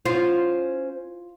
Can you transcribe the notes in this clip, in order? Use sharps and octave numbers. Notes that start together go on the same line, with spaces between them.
C#4 F4 C5